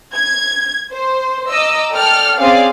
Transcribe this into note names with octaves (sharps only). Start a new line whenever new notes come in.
G#6
C5
D#5 A#5 D6 E6
A4 D5 G5 F6
C4 C#4 G#4 D5 F5